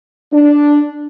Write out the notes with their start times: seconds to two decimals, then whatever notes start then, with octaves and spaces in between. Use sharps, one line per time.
0.32 D4